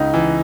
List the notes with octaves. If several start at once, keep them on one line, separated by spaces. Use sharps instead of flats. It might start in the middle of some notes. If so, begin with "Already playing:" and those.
Already playing: C#2 D#4
E3